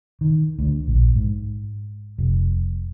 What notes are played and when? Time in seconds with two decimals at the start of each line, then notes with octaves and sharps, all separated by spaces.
0.21 D#3
0.59 D2
0.88 A#1
1.16 G#2
2.18 F1